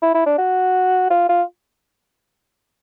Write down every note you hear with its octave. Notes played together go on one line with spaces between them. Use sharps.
E4
E4
D4
F#4
F4
F4